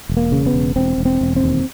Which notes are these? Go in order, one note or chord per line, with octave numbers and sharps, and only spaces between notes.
E1
A#3
C#3
B3
E1
E1 C4
E1
C4
E1
C4
D#2